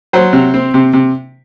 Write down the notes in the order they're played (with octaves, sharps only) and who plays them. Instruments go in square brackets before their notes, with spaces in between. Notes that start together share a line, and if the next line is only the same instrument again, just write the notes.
[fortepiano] F#3 C5
C3
C4
C3
C3